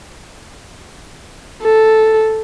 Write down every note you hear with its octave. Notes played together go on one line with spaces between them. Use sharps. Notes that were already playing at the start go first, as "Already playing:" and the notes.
A4